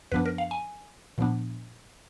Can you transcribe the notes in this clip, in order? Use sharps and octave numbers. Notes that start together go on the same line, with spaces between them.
F#2 F3 B3 D4 B4
A#4
F5
G#5
A#2 F3 B3 D4